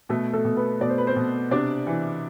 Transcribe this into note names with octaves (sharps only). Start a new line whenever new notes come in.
B2 A3 A4
A3 A4
B2
B3 B4
B2 D5
C5
B4
C4 C5
B2
C3 D4 D5
E3